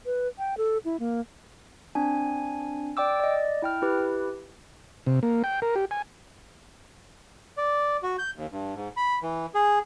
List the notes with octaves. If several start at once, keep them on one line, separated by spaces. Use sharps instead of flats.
B4
G5
A4
E4
A#3
C4 D4 G#5
D5 G5 D6 E6
D5 D#5
E4 G5 F6
E4 G4 B4
C3
A#3
G5
A#4
G4
G#5
D5
F#4
G6
D#2
G2
G#2
B5
E3
G#4